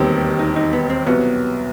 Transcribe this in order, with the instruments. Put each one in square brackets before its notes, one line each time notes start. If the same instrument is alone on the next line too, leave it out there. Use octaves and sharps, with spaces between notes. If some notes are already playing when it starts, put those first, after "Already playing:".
Already playing: [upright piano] E1 D#2 D#3 G3 C4 [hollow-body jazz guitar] B3
[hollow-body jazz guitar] D#4
D#4
B3
C4
[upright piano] C2 B2 F#3 [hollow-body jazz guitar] B3